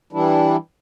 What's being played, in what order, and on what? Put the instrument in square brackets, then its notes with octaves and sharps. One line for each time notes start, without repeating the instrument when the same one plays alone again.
[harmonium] E3 G3 D4 E4